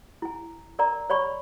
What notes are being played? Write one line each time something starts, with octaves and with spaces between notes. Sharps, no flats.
E4 G#5
A#4 D5 A#5
C#5 D5 B5 C#6